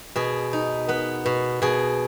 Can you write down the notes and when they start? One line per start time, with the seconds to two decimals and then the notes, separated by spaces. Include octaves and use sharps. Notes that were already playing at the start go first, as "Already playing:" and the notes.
0.16 B2 G#4
0.53 D#4
0.89 B3 B4
1.26 B2
1.62 B2 G#4